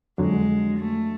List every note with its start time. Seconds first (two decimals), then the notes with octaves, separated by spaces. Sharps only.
0.18 F2 D3 F#3 G#3
0.77 A3